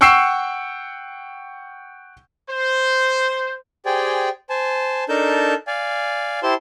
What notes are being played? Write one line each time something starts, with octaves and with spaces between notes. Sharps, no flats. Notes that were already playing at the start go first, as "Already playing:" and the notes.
F#5 G5 C#6 E6 C7 E7
C5
G4 G#4 C5 D5 G5 G#5
C5 G#5 A5
D4 D#4 A4 A#4 A5 G6
D5 F5 G#5
E4 G4 C5 A5 C6